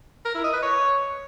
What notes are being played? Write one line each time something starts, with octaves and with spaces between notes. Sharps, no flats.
A#4
E4
D#5
B4
C#5